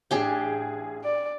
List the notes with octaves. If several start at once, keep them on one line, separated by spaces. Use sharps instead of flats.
A1 D4 G4 G#4 G5
D5